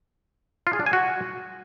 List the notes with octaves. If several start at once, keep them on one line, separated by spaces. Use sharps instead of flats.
F4
G#4
D4
G#5
F#4